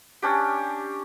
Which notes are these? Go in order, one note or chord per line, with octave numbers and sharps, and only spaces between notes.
C#4 D4 G4